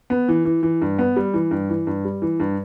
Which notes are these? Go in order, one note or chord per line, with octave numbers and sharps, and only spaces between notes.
B3
E3
E3
E3
G2
B3
G3
E3
G2
E3
G2
G3
E3
G2